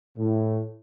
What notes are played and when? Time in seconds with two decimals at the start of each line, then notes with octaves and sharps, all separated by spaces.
0.18 A2